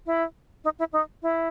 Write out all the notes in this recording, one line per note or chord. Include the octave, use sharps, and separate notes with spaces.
E4
D#4
E4
D#4
E4